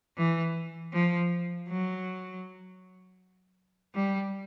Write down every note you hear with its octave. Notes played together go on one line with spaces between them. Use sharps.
E3
F3
F#3
G3